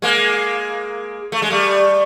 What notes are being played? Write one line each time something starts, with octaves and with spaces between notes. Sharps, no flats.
G#3 A#3
A3
G#3
G3 A3